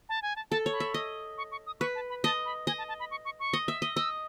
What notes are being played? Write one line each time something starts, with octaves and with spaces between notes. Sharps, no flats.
A5
G#5
A5
A4 A5
C#5
B5
E5
D#5
C#6
C#6
D#6
B4 C#6
A5
B5
D#5 A5
B5
D#5 G#5
A5
A5
B5
C#6
C#6
C#6
D#5
E5
D#5
D#5 E6